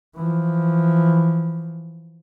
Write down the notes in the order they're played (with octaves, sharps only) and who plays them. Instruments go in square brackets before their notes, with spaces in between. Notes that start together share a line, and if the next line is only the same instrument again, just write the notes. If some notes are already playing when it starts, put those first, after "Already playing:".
[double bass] E3 F3